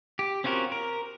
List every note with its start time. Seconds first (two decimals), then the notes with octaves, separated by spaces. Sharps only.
0.19 G4
0.44 C4 C#4 F4 F#4 A#4
0.72 A#4